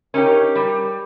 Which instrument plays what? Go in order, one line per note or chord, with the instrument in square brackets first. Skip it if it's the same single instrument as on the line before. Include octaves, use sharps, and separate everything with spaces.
[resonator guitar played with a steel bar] C#4 D#4 G4 [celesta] A#4
[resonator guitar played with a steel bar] G3